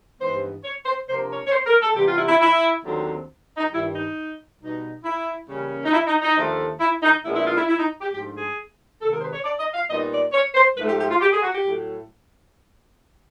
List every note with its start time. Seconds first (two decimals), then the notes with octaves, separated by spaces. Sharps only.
0.20 G2 E3 G#3 B3 D#4 C5
0.64 C#5
0.86 C5
1.08 C3 F3 A#3 D4 C5
1.30 C#5
1.47 C#5
1.52 C5
1.66 A#4
1.81 A4
1.96 C3 E3 G3 B3 G4
2.07 F4
2.17 E4
2.28 E4
2.40 E4
2.84 D#2 D3 F#3 A3 C4
3.57 D#4
3.72 G2 D#3 G3 E4
3.95 D#4
4.60 B2 G3 B3 D#4
5.04 E4
5.48 C#3 E3 G3 A#3 C#4
5.85 D#4
5.93 E4
6.07 D#4
6.22 D#4
6.36 D#2 D3 F3 A3
6.80 E4
7.02 D#4
7.24 A#2 F3 G#3 B3 D4 E4
7.36 E4
7.46 F4
7.57 E4
7.68 E4
7.79 D#4
8.01 G4
8.12 G#2 F3 A3 D4 G4
8.35 G#4
9.01 C3 D#3 G#3 A4
9.12 A#4
9.18 C5
9.23 B4
9.33 C#5
9.44 D5
9.59 D#5
9.74 F5
9.89 A#2 G3 B3 D#4 D#5
10.10 D5
10.33 C#5
10.55 C5
10.76 G#2 F3 A3 B4
10.87 G4
10.99 G4
11.10 F4
11.21 G4
11.32 G#4
11.43 F#4
11.54 G4
11.64 A2 F#3 A3